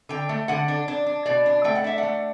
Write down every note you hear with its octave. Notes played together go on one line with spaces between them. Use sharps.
D3 G5
A3
D3 F#5
D4
D4
D4
B2 D5
D4
A3 G5
F#5
D4 E5
F#5
A3